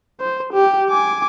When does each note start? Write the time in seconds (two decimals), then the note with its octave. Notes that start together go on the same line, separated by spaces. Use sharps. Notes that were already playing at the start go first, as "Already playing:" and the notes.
0.20 C5
0.53 G4
0.89 G#5 D6